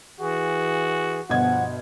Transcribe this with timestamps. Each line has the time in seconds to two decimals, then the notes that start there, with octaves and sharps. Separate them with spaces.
0.20 E3 F#4 G#4
1.30 G1 B2 F3 F#5 G#6